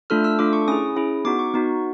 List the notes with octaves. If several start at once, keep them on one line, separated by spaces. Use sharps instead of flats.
A3 D4 F4 A4 F6
E6
A3 D4 F4 A4 D6
C#6
C#4 E4 G#4 D#6
C#4 E4 G#4
B3 D#4 F#4 D6
C#6
B3 D#4 F#4